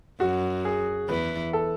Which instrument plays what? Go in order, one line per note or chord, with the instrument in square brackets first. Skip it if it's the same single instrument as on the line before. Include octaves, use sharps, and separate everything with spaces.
[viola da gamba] F#2 [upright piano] F#4
[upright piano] G#4
[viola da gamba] E2 E3 [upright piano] B4
[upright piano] A4